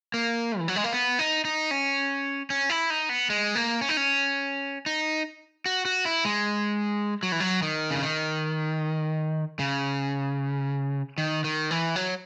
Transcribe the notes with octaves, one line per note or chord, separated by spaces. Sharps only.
A#3
E3
F#3
G#3
A#3
B3
D#4
D#4
C#4
C#4
E4
D#4
B3
G#3
A#3
C#4
D#4
C#4
D#4
F#4
F#4
E4
G#3
F#3
E3
F#3
D#3
C#3
D#3
C#3
D#3
D#3
E3
F#3